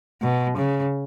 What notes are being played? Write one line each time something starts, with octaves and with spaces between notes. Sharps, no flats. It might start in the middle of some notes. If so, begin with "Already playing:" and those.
B2
C#3